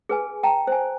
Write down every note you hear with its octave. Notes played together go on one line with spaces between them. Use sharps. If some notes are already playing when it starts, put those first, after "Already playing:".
G#4 B4 G#5
G5 A5 A#5
C5 G#5